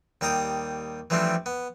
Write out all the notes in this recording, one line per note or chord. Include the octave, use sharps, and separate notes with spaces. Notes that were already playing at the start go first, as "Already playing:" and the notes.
D#2 G3 G5 A#5 D#6
E3 F3 G3 A3 C4 D4
B3